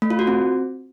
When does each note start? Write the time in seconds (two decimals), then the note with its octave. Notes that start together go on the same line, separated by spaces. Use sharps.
0.02 A3
0.10 F4
0.19 F#4
0.27 C4